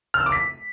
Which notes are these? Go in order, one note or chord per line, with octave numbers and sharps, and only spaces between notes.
F6
E6
D6
B6